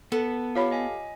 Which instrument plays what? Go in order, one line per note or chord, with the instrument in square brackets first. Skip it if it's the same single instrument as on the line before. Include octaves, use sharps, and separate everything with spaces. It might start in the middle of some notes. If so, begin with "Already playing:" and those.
[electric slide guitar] B3 [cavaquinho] A4
[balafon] F4 C#5 B5 [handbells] G4 F5
[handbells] D#5 G#5 B6